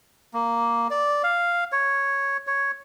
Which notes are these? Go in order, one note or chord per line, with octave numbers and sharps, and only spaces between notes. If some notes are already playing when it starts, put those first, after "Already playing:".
A#3
D5
F5
C#5
C#5